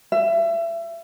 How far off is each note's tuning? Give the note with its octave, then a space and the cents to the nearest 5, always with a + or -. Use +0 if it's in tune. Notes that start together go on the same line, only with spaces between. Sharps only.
E5 +30